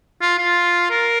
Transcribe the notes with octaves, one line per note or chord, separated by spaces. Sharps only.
F4
F4
A#4